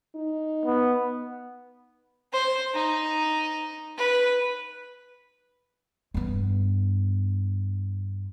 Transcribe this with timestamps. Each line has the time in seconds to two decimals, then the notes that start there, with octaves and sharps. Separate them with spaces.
0.16 D#4
0.65 B3
2.33 C5
2.74 D#4
3.97 B4
6.14 G2 B3